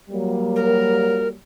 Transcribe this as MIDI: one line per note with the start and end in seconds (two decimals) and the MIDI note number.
0.10 1.34 54
0.10 1.34 55
0.10 1.34 58
0.55 1.27 70